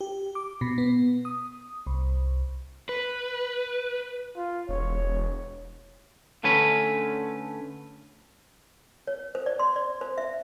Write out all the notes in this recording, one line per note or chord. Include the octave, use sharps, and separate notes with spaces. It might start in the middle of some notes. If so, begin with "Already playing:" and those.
G4
D6
B2
B3
D#6
C2
B4
F4
E1 C#5
D3 A3 C#4 B4
C#5
C5
D5
C6
D5
C5
E5